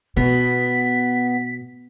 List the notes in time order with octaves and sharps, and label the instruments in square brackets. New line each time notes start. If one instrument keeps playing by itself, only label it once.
[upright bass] B2 [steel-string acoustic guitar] B3 [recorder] B6